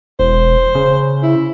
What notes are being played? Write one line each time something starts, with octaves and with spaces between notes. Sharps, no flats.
E1 C5
C#3
E4